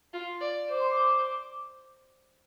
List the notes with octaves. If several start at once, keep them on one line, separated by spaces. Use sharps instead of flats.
F4
D5
C5 D6
C6
D6